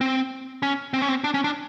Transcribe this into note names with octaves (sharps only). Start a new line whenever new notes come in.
C4
C#4
C4
C#4
C4
D4
C#4
D4